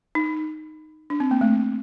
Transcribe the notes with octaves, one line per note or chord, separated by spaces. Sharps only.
D#4
D4
C4
A#3
A3